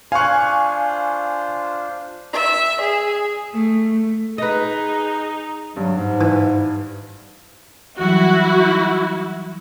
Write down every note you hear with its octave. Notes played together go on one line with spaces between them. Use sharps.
D4 F4 C5 F5 G#5 C#6 F#6
E5
G#4
A3
D#4 G#4 B4 D#5
G2 F#3
G#2
E3
E3 F#3 G3 E4 F#4